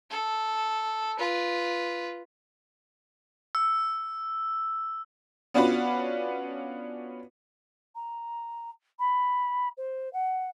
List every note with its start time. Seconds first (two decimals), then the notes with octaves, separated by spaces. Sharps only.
0.10 A4
1.19 F4 B4
3.55 E6
5.54 B3 C#4 D4 F4 F#4 B4
7.96 A#5
8.99 B5
9.77 C5
10.13 F#5